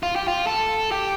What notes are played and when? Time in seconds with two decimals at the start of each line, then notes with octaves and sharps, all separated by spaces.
0.03 F4
0.16 G4
0.28 F4
0.47 A4
0.91 G4